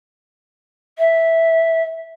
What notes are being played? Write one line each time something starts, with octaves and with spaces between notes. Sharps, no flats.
E5